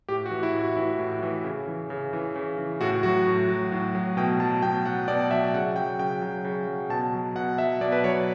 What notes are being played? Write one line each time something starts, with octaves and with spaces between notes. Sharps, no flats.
A2 G4
F#4
E3
E4
A2
F#4
E3 E4
A2
E3
C#3
E3
C#3
E3
C#3
E3
A2 F#4
F#3 F#4
A2
F#3
A2
F#3
B2 G5
F#3 A5
B2 G5
F#3 F#5
B2 D5
F#3 E5
C#3 F#5
F#3 G5
C#3 G5
F#3
C#3
F#3
B2 A5
F#3
B2 F#5
F#3 E5
B2 D5
B4
F#3 C#5